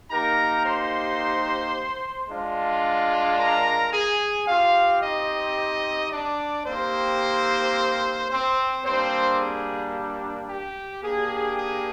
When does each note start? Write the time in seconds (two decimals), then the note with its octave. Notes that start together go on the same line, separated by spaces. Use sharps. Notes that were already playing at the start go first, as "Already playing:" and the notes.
0.11 A#3 D#4 G4 A#4 A#5
0.65 C5 C6
2.29 G#3 D4 F4
3.39 A#4 A#5
3.93 G#4 G#5
4.47 C4 F4 G4 F5
5.02 D#4 D#5
6.12 D4 D5
6.66 A#3 C4 D#4 G4 C5
8.30 C4 C5
8.84 G3 A#3 C4 D4 C5
9.39 G#4
10.48 G4
11.03 A#3 D4 G4 G#4
11.58 G#4